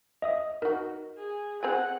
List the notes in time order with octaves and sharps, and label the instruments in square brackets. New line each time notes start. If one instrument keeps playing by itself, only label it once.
[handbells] D#5 E5 D#6
[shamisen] D#4 F#4 [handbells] A#4
[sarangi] G#4
[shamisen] C4 G#4 G#5 [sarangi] F#5